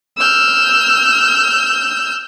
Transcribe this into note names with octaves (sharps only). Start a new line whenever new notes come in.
E6 F6 G6